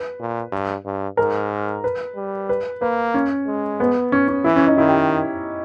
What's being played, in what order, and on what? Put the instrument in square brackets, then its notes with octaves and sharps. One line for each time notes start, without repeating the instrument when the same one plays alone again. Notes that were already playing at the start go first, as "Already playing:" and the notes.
Already playing: [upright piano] B4
[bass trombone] A#2
G2
G2
[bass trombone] G#2 [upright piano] A#4
[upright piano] B4
[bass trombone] G3
[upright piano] B4
[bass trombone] A#3 [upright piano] B4
[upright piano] C#4
[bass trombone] G#3
[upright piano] B3
C#4
C#4
[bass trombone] E3 [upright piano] E4
[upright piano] C#4
D#4
[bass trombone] D#3 [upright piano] E4
[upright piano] G4